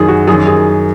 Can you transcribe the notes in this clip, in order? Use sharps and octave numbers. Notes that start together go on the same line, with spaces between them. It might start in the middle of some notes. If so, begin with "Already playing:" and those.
Already playing: F#2 D#3 G#4
F#4
F#2 D#3 G#4
G#4